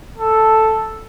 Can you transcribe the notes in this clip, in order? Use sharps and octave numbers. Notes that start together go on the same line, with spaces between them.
A4